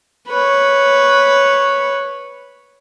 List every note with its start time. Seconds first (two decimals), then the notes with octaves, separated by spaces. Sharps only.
0.29 B4 C#5